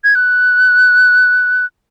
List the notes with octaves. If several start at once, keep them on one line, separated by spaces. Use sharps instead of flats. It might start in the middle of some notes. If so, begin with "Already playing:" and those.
G#6
F#6